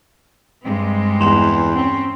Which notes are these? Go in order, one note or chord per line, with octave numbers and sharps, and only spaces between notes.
G2 G#3 C4
E2 C6 E7 F7
C4 C#4